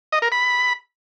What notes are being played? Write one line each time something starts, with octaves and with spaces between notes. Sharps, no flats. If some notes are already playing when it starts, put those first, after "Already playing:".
D#5
A#4
B5